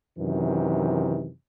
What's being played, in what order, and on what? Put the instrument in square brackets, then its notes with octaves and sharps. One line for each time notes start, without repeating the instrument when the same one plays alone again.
[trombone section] F#2 C3 D#3 E3